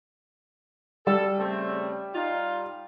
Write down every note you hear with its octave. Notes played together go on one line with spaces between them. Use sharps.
G3 A4
C#3 A3 C4
D#4 F4